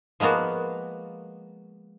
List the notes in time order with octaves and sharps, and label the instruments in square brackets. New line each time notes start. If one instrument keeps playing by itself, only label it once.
[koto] F3 G#3 A#3 B3 F#4